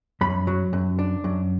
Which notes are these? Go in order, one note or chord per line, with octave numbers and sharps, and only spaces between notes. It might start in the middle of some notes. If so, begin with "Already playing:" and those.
F#2 B5
F#3
F#2
D4
F#2